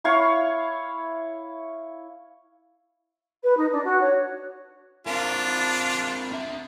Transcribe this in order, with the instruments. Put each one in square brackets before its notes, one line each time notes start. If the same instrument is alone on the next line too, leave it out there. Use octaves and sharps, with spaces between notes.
[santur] E4 C#5 F5 C#6
[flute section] B4
D#4
D4
F#4
C#5
[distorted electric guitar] C4 A#4 [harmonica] D4 F4
[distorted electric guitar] D4 E5